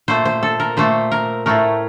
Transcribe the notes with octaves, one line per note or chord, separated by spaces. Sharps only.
A#2 A3 C5
C5
A4
A#4
A#2 A3 C5
A#4
A2 A3 A#4